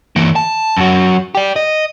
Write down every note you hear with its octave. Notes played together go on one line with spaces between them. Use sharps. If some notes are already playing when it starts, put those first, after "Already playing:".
E3 A#3
A5
F#2 F#3
G4 D5
D#5